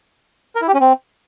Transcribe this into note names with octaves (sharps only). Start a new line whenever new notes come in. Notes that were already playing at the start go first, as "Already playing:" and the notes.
A#4
E4
G4
C#4
C4